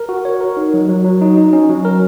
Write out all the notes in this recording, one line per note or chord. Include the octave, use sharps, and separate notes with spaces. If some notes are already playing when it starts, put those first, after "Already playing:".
Already playing: A#4
F#4
C#5
A#4
D#4
F#3
F#3
F#3
D#4
D#4
C#4
F#3
A#4